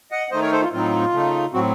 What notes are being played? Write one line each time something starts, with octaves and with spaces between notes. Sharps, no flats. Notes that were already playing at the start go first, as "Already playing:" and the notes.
D#5 F#5
D#3 A3 D#4 C5 D#5
A#4 C#5
A4 C5
F4
A2 F#3 C4 D#4 F4
C#3 A3 D#4
A2 F#3 C4 F#4